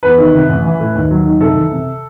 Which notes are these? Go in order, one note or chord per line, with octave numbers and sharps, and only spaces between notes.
E2 B4
D#3
C3
A1
E3
A2
D#2
F#3
D#3
C2 A4
E3
C3